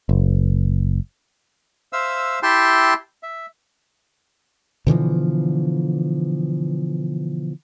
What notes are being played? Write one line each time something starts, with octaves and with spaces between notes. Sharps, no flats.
F#1
C5 E5 F5 E6
E4 G4 E5 G5 A5 C6
E5
B2 D3 E3 F3